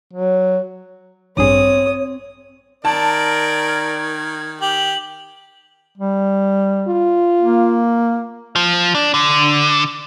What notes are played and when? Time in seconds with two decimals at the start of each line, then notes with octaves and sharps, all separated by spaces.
0.13 F#3
1.37 A1 G2 C4 G#4 C#5 D#6
2.85 D#3 A#4 D5 A5 G#6
4.61 G4 F#7
5.98 G3
6.88 F4
7.41 A#3
8.56 F3
8.95 D4
9.14 D3